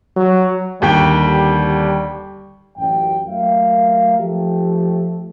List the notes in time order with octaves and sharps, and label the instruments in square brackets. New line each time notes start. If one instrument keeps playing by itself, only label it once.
[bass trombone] F#3
[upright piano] D#2 G4 G5 [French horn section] D3 G3
[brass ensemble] A1 F#2 G5
F#3 A3 A#3 A#4 E5 F5
F3 A3 G4